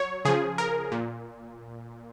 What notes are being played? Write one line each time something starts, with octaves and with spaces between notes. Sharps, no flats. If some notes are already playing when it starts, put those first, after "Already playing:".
Already playing: F#3 C#5
C#3 F3 G#4
A#4
A#2